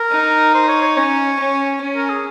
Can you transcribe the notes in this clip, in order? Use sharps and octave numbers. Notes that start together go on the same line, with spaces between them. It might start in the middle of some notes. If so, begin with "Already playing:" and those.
Already playing: A#4
D#4
C5
C#5
C#5
C#4 C#5
C#4
C#4
A#4
G#4